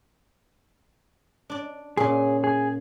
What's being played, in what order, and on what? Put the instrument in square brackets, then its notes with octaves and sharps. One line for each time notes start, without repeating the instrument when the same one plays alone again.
[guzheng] D4 D5
[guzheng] A#2 C#3 [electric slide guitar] G#4
[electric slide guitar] G#4